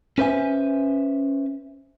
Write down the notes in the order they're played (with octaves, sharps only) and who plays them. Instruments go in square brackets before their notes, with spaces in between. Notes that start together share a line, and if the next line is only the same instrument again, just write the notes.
[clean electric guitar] C#4 B4 C5 E5 G#5